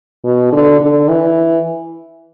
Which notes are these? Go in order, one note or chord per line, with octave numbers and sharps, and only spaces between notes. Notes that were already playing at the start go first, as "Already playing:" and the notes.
B2
D3
D3
E3